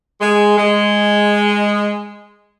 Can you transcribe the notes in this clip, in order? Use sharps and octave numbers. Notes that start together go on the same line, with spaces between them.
G#3
G#3